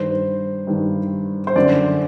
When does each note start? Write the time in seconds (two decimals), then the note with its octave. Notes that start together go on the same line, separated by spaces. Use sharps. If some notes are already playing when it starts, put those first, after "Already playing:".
Already playing: G2 D#3 C5
0.67 G2 D#3
1.47 C5
1.56 F#2 D3 D5